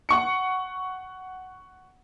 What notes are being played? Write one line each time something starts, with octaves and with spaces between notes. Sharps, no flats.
F#5 C#6 C#7